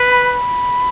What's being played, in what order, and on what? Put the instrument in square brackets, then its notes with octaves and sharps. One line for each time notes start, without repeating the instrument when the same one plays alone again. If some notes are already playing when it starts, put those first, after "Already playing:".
Already playing: [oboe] B4
[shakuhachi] B5